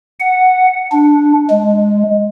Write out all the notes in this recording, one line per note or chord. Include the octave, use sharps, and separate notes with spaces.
F#5
D4
G#3